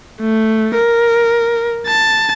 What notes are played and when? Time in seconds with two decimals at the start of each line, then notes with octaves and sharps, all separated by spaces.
0.21 A3
0.75 A#4
1.87 A5